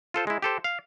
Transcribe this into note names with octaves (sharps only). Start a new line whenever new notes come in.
F4 A4 C5
G#3 E4
G4 A4 C5
F5